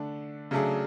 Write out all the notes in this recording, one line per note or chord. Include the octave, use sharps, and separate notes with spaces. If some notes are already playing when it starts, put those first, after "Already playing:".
Already playing: D3 A3 D4
C#3 F#3 A3 D4 G#4